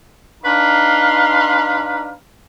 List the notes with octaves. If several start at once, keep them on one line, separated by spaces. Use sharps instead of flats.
D4 D#4 B4 F5 A#5 C6